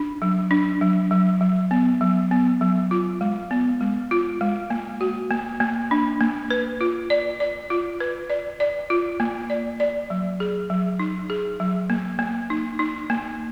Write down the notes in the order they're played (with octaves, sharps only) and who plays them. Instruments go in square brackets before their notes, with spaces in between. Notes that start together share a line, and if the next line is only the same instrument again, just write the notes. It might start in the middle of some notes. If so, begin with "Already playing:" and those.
Already playing: [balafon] D4
F#3
D4
F#3
F#3
F#3
B3
F#3
B3
F#3
F4
G#3
B3
G#3
F4
G#3
A#3
F#4
A#3
A#3
D4
A#3
B4
F4
D5
D5
F4
B4
D5
D5
F4
A#3
D5
D5
F#3
G#4
F#3
D#4
G#4
F#3
A#3
A#3
D#4
D#4
A#3